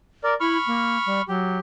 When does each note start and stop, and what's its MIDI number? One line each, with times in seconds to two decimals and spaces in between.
0.24 0.34 70
0.24 0.34 74
0.40 0.57 64
0.40 1.22 83
0.40 1.22 85
0.40 1.22 89
0.67 0.98 58
1.06 1.21 55
1.28 1.59 54
1.28 1.60 67